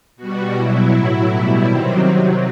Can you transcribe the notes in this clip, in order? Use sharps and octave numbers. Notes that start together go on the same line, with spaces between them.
B2 G3 F#4
B2 F#3 E4
A2 F#3 E4
B2 G3
C3 D#3 F#3 C4
C3 F#3